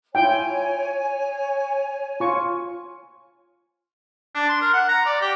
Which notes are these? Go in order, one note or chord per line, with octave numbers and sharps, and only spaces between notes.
E4 F4 C#5 G5 G#5
F4 C#6
D4
C6
A#4
F#5
A#5
D5
G4